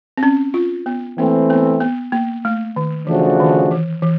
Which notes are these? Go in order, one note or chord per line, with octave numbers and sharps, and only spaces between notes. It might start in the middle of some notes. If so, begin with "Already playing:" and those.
C4
C#4
F4
B3
E3 A3 A#3 C4
B3
B3
A#3
A3
D#3
C#3 E3 F3 A3 D4 F#4
D#3
E3
E3